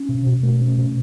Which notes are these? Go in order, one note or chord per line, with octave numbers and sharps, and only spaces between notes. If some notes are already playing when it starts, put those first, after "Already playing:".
Already playing: C#4
B2
B2
A3
C#4
B2